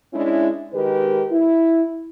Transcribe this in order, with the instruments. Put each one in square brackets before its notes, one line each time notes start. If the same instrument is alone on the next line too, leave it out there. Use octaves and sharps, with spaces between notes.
[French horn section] G#3 C#4 D4 E4
D#3 G#3 G4 A#4 B4
E4